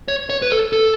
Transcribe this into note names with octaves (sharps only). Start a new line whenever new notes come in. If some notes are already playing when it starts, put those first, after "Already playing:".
C#5
C#5
B4
A4
A4